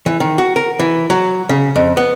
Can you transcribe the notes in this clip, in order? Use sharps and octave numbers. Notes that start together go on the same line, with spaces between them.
E3
D#3
F#4
A#4
E3
F#3
C#3
F2
B3